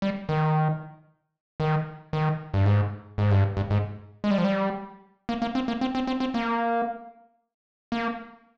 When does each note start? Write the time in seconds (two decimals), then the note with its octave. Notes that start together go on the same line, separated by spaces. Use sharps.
0.02 G3
0.29 D#3
1.60 D#3
2.13 D#3
2.54 G2
2.66 G#2
3.18 G#2
3.31 G2
3.57 G2
3.70 G#2
4.24 G#3
4.31 G3
4.38 F3
4.45 G3
5.29 A#3
5.42 A#3
5.55 C4
5.68 A#3
5.81 C4
5.95 C4
6.07 C4
6.20 C4
6.34 A#3
7.92 A#3